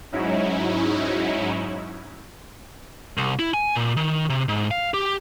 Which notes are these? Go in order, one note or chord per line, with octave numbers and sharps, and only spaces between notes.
G#2 F#3 C#4 D#4 E4
C2
E4
G#5
A#2
D#3
C3
G#2
F5
G4